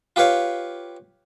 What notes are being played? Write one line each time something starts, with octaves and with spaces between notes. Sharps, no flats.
F4 G4 B4 C#5 F5